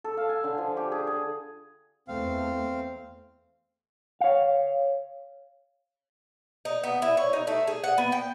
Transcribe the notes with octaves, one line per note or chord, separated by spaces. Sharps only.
A4
F5
G#5
D3
F3
G4
G#4
G#4
E2 A3 C4 F5
C#5 F5
D#4
B3
E4
C#5
D#4
A3
G#4
F#5
B3
G5